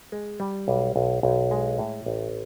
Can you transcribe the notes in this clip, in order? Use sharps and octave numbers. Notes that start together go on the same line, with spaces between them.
G#3
G3
B1
B1
B1
G#3
A2
A1